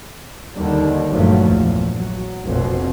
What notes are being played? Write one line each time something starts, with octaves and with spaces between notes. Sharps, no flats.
D#2 D3 D#3 G3
G1 G2 A#2 F3 F#3 A3
A#1 E2
F#3
F1 A#1 F2 B2